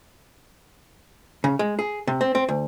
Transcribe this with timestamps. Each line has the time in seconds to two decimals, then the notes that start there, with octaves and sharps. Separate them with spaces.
1.44 C#3
1.59 G#3
1.79 G#4
2.07 C3
2.21 C4
2.35 C4
2.49 D2